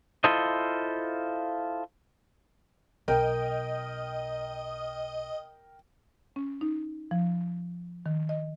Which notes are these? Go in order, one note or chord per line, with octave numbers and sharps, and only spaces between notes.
E4 F4 A4 C5 D#5
B1 A#4 D#5 G5
C#4
D#4
F3
D#3
D#5